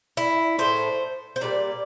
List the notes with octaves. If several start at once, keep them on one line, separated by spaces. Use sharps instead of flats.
E4
A2 F3 A3 C5
C5
A#2 G3 D5